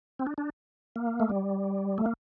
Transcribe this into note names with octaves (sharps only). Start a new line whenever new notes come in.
C4
D4
D4
A#3
A3
G3
A3
A#3